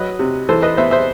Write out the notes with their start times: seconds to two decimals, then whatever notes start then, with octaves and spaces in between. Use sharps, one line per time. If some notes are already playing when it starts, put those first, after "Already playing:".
Already playing: F#3 B4 D#5
0.19 C3
0.49 E3 A4 C5
0.62 B4 D#5
0.77 B3 C5 E5
0.91 C5 E5